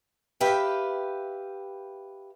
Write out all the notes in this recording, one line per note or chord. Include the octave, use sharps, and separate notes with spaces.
G4 B4 E5 F5 G5